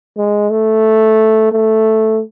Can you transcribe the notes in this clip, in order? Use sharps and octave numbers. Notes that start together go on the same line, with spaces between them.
G#3
A3
A3